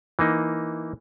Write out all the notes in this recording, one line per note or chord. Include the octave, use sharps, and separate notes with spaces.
E3 A#3 D#4